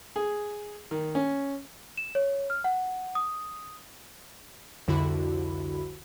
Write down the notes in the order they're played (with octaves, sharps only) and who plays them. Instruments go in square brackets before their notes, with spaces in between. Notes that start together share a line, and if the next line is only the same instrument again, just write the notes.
[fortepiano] G#4
D#3
C#4
[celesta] E7
C#5
F6
F#5
D#6
[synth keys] C2 F2 D3 E4 F#4 B5